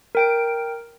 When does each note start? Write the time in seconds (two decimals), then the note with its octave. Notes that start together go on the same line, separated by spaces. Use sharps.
0.15 A#4 G5 D7